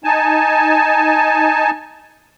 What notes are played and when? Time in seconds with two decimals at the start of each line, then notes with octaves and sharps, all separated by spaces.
0.04 D#4 G#5 A5